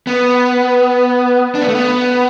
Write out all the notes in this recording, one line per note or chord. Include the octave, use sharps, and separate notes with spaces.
B3
D4
B3
A3
B3